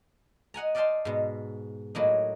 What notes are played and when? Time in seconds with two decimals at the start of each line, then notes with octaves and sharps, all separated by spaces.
0.54 D#5 F#5 G#5 A#5
0.75 D5 D#5 F5 G5 A5 C6
1.05 G#2 B2
1.95 A2 F#3 A#3 D#4